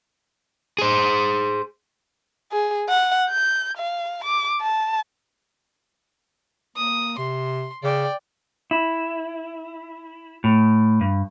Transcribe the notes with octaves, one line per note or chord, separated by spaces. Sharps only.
G#4 C5
G#4
F#5
G6
F5
D6
A5
A#3 D#6
C3 C6
C#3 D5 G5
E4
A2
G2